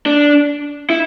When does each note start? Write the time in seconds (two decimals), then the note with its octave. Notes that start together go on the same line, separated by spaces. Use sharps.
0.06 D4
0.90 E4